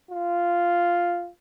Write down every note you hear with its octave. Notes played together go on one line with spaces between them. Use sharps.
F4